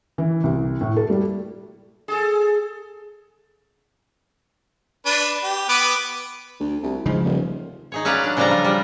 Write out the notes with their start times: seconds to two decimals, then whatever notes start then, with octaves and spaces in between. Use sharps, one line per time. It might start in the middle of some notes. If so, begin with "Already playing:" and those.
0.18 E3
0.43 C2
0.81 A2
0.97 A4
1.10 G3
2.08 G#4 A4
5.06 D4 B4
5.43 G4
5.69 B3 B4 D6
6.60 D2
6.83 C2
7.06 G#2 C#3 F3
7.24 D#1
7.92 D#4 G#4 C#5
8.05 F#3 C#4 B4 D5 F5
8.24 D4
8.37 C#3 F3 G3 D4 A4 A#5
8.51 F4
8.65 G3